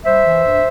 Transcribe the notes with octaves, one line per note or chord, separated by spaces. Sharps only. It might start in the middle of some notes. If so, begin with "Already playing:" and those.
G3 C5 E5
E3
G2